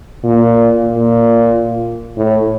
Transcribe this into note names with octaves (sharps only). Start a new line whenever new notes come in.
A#2
A#2
A2